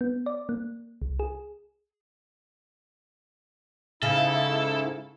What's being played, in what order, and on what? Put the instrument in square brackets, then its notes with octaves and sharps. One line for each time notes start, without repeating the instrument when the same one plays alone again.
[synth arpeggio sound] B3
D5
A#3
C2
G#4
[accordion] G#2 E4 [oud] C#3 [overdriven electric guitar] A4